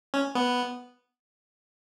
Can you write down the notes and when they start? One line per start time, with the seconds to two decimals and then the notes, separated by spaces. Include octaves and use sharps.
0.14 C#4
0.35 B3